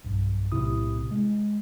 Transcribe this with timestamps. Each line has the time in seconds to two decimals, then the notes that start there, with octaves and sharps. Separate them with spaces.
0.05 B1 G2
0.52 B1 A2 C3 E4 D#6
1.11 G#3